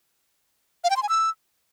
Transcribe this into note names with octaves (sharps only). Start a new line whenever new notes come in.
F5
G5
C6
G#5
E6